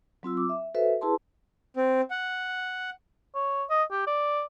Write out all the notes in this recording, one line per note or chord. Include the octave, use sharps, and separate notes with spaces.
F#3 C4 F4 E6
D6
E5
F#4 A4 B4 C5 E5
E4 G#4 B4 A5 C6
C4
F#5
C#5
D#5
G4
D5